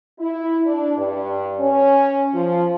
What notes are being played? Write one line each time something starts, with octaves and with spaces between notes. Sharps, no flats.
E4
D4
G2
C#4
F3